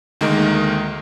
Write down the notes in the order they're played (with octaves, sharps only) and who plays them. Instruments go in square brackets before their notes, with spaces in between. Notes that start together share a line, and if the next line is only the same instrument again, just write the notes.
[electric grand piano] D2 D#3 G#3 A#3 A#4 D#5